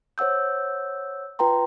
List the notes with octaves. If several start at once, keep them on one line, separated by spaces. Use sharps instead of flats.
C5 C#5 F#5 E6 G6
F4 B4 G5 A#5 C6